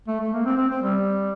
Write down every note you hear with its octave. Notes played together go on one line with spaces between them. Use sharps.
A3
A3
A#3
C4
C4
C4
G3